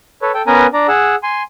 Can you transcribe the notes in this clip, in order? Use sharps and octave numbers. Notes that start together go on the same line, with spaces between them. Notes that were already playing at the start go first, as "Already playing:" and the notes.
A4 B4 C#5
A4 G5
B3 C#4 A#4 B4 G#5 A#5
D4 D5 A#5
G#4 F#5 E6
G#5 C6